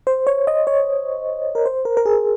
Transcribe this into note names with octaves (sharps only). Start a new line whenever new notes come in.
C5
C#5
D#5
C#5
A#4
C5
A#4
A#4
G#4